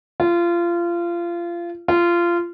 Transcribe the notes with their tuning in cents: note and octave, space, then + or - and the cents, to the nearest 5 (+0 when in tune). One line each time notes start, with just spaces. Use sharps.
F4 -25
F4 -20